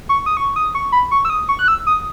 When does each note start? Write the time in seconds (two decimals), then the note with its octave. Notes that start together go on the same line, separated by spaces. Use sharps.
0.09 C#6
0.26 D#6
0.37 C#6
0.56 D#6
0.75 C#6
0.92 B5
1.11 C#6
1.25 E6
1.30 D#6
1.49 C#6
1.59 F#6
1.68 E6
1.87 D#6